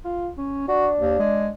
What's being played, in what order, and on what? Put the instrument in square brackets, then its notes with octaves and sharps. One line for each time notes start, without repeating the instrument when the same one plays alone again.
[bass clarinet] F4
C#4
[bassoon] D4 [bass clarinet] F#4
[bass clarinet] D#2
G#3